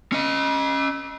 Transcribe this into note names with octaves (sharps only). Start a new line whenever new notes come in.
C#4 D#5